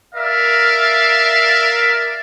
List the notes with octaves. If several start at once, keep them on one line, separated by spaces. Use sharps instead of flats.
A#4 D5 E5 F5